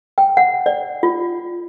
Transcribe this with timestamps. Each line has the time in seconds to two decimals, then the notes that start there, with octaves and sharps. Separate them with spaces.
0.18 G5
0.37 F#5
0.66 D5
1.03 F4